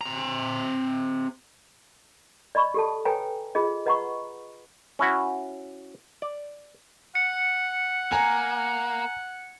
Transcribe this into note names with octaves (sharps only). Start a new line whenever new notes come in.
C4 A#5
D5 D#5 B5 C#6
G4 A4 A5
A4 B4 C#5 G5 G#5 A#5
F4 G#4 D#5
B4 D#5 F#5 A#5 B5 C#6
C#4 E4 F#4
D5
F#5 C#7
A#3 G#5 A#5